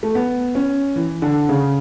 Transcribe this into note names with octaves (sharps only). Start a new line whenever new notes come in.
A3
B3
C#4
E3
D3
C#3